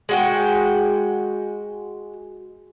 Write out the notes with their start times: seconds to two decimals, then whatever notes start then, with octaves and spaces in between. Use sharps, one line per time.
0.09 G#3 F#4 G5